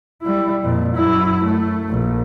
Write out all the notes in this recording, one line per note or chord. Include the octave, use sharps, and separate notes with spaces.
G3 E4
F2 A#2
F#2 E4
A3
A#1